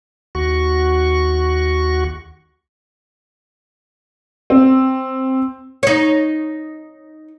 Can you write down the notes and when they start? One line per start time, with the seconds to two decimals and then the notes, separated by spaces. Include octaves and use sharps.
0.35 D#2 F#4 C#6
4.50 C4
5.83 D#4 C#5